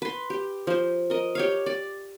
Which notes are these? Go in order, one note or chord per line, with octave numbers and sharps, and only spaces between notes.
B4 C6
G4
F3 C5
A#4 D#5
G4 C#5 F5
D5